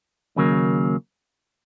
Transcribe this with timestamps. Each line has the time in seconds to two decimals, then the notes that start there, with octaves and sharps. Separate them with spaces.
0.36 D#2 C#3 F#3 A#3